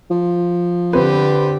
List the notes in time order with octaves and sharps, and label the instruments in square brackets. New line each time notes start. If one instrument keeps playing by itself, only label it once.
[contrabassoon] F3
[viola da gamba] D3 G4 [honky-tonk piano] C4 B4